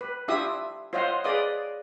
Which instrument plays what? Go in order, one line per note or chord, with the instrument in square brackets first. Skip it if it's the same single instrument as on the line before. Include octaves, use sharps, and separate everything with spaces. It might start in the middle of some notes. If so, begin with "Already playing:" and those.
[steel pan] B4
D4 E4 F4 G4 E5 D#6
F4 C5 C#5 D#5 F5 F#5
G#4 B4 D5 D#5 F5 D#6